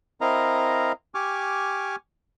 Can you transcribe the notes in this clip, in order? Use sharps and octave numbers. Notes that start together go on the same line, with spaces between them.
C4 E4 A#4 D#5 F5 A#5
G4 G#5 C#6 D6 F6